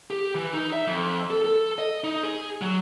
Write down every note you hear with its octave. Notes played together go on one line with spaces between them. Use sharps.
G4
E3
D#4
E5
F2
A4
A4
D#5
D#4
G#4
F#3